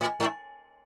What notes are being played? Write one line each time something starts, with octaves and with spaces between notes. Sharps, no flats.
A2
G#2